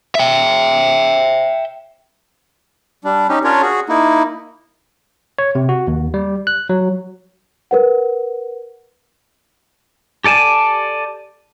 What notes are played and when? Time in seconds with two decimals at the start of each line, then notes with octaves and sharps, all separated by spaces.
0.15 E5 G5
3.04 G3 D4
3.29 C#4 D#4 G4
3.44 C#4 D4 F4 A#4 C#5
3.62 F#4 G#4
3.89 A#3 D#4 E4
5.39 C#5
5.55 C3
5.69 F#4
5.87 D#2
6.14 G3
6.47 F#6
6.70 F#3
7.71 A#4 B4 F#5
10.24 G4 A4 D5 G#5 A5